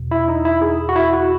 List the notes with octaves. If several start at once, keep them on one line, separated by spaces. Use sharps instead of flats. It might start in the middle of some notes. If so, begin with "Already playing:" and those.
Already playing: E2 B2
E4
D#4
E4
G#4
F#4
E4
F#4